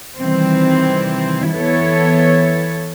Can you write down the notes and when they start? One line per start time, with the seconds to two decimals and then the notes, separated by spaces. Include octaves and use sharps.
0.17 C3 D#3 E3 G3 C4
1.50 E3 B3 E4 A4 C#5